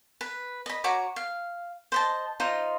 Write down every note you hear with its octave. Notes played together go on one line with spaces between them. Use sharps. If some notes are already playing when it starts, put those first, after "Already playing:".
B4
D#5 B5
F#4 C#5 A#5 D6
F5
C5 D#5 A5
D#4 F4 C5 D#5